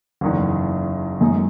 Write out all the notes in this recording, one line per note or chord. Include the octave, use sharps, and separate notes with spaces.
F#1 E2 D#3
F#2 D#3 G#3 D#4